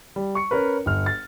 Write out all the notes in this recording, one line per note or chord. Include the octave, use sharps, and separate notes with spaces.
G3
C#6 C#7
C#4 A#4 B4
G1 F6
A6